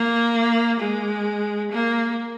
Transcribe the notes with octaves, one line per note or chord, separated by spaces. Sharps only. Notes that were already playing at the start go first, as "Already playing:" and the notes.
Already playing: A#3
G#3
A#3